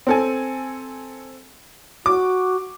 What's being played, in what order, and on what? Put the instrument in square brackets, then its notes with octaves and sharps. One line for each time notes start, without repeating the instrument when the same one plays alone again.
[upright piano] C4 A4 G#5
[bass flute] F#4 [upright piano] D6